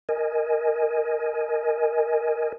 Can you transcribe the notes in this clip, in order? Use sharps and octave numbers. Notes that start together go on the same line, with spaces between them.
A#4 D#5 G#5